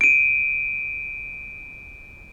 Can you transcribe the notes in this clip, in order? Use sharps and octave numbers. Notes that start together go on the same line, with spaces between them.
D7 D#7